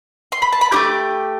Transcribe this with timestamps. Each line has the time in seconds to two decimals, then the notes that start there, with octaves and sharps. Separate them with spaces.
0.32 C6
0.42 B5
0.53 A5
0.61 B5
0.72 A3 E4 G4 D6